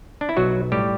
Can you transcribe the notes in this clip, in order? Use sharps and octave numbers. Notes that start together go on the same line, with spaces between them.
D4
E4
B1 F#3 F#4
A2 G3 G4